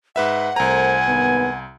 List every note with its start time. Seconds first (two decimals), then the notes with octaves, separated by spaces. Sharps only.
0.16 G#2 B4 E5 F#5
0.56 C2 A3 A#4 C5 G#5 A#5
1.06 D#2 G#2 B3